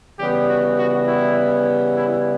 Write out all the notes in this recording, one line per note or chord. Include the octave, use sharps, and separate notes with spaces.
C#3 E3 G3 B3 G4
F#4
F#4
E4
E4